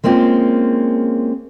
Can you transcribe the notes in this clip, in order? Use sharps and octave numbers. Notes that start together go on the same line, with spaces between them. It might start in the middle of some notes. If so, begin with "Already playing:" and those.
G#3 A#3 C4 C#4 F4